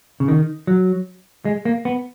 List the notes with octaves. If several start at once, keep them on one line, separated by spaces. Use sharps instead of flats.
C#3
D#3
F#3
G#3
A#3
B3